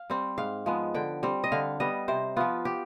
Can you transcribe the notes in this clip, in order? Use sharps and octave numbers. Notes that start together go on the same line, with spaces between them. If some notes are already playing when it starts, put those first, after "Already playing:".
Already playing: F5
G3 C4
G#2 F5
F3 G#3 B3
D3 G5
G3 C4
D#5
D3 F5
G3 B3 D#5
C3 C5
F3 B3 F4
G4